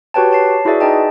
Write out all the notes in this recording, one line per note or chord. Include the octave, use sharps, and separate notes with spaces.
F#4 G4 B4 C#5 G5 A5
C#5 A5 C7
E4 F#4 G#4 B4 D5 E5
D#4 G#4 D#5 G5 A5